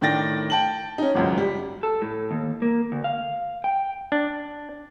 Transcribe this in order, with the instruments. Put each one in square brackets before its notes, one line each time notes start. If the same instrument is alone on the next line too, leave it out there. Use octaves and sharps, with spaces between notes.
[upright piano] A2 D#3 D4 G5 A6 A#6
G5 A5 F#7
C#4 D#4
G#1 C#2 F#2
G3
[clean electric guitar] A4
A2
D#2
A#3
D2
F5
G5
[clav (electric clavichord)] D4